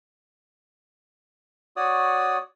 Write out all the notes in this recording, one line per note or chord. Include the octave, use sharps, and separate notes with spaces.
F#4 C#5 D5 D#6